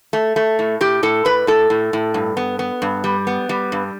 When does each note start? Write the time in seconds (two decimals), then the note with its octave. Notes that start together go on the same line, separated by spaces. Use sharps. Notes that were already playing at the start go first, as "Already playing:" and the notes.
0.13 A3
0.36 A3
0.59 A2
0.81 A2 G4
1.03 A2 A4
1.25 A2 B4
1.47 A2 A4
1.70 A2
1.93 A2
2.14 G2
2.37 B3
2.59 B3
2.82 G2
3.04 G3
3.27 B3
3.49 G3
3.72 G2